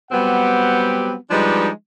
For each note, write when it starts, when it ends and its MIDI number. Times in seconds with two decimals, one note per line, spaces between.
0.12 1.14 54
0.12 1.14 55
0.12 1.14 59
0.12 1.14 60
0.12 1.14 67
0.12 1.14 78
1.30 1.69 53
1.30 1.69 55
1.30 1.69 56
1.30 1.69 62
1.30 1.69 63
1.30 1.69 71